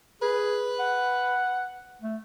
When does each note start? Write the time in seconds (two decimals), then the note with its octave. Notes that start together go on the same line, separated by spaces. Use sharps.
0.22 G#4 B4
0.79 F#5
2.02 A3